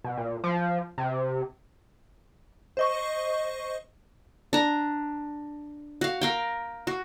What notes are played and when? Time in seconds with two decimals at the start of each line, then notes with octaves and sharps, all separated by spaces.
0.04 B2
0.17 A#2
0.44 F3
0.98 C3
2.77 C5 D#5 C#6
4.53 D4 A#5
6.01 F#4 F5
6.21 A#4 F5 G5
6.87 F#4